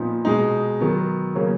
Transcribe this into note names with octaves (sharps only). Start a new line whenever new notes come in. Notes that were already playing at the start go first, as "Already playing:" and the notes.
Already playing: A#2 F3 B3 D#4
B2 G#3 D#4
D#3 F#3 B3
C#3 F#3 A#3 C#4